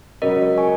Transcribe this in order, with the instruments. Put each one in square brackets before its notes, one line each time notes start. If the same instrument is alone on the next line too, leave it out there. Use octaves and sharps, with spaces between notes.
[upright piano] C#2 C#3 F#3 C#4 F#4 [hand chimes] A#4 D#5
[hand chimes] G#5 C#6